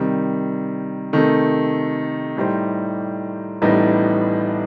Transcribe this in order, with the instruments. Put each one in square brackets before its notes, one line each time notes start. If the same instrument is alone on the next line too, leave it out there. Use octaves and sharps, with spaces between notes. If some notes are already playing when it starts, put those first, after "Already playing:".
Already playing: [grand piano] C3 D#3 G3
C3 D#3 A3
A2 G3 D#4 G4 C5
A1 A2 G3 B3 D#4